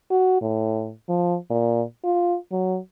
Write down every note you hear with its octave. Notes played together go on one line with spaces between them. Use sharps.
F#4
A2
F3
A#2
F4
F#3